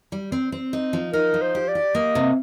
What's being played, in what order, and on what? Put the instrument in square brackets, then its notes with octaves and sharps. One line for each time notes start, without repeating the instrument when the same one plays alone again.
[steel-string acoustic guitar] G3
C4
C4
D#4
F3
[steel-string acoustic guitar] D#4 [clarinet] A#4
[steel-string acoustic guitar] F3
[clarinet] C5
[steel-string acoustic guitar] G4
[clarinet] D5
[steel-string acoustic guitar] G4
[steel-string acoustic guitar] A#3 [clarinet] D#5
[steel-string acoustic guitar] C3